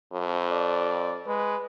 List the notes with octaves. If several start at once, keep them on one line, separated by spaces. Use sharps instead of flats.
F2
D5
G#3 B4